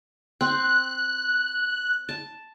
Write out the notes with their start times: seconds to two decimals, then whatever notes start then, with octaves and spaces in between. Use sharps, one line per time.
0.41 C4 F#6
2.09 A5